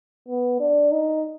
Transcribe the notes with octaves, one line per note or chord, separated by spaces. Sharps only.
B3
D4
D#4